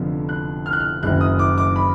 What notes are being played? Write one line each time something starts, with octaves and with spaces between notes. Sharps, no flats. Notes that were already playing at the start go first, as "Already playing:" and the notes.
Already playing: F1 F2 D3 F3 B3
F#6
F6
F#6
F6
F#1 F#2 D#3 F#6
D#6
D6
D6
B5